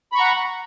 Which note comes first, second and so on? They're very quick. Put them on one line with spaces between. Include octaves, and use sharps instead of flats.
B5 C#6 A#5 F#5